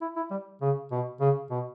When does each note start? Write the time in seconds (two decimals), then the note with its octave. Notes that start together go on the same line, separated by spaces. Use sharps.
0.01 E4
0.16 E4
0.31 G3
0.61 C#3
0.92 B2
1.20 C#3
1.50 B2